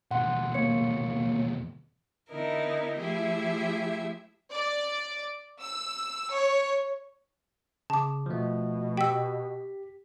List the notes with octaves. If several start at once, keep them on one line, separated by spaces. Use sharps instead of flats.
D#2 B2 F#5 C6
A#3 C#5 C#7
D3 B3 D#4 E4 A#4
F3 A3 E4 G4 G#4 E5
D5
E6
C#5
C#3 A5 D6
B2 F3 A3
G4 G5 E6 B6